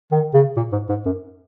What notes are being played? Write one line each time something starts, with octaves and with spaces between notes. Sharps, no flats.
D#3
C#3
A#2
G#2
G#2
F#2